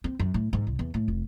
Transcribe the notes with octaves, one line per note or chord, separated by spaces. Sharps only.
C4
F#2
A2
G#2
C2
E2
A2
F1